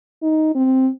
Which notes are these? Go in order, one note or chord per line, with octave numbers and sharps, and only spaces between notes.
D#4
C4